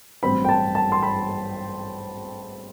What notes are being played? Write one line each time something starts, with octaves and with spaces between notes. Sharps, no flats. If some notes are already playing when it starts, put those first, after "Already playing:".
A1 G2 F#3 C4 B5
G5
A5
A5
C6
B5